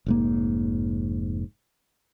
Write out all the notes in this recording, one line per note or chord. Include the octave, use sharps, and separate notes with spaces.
F1 G#2 A#3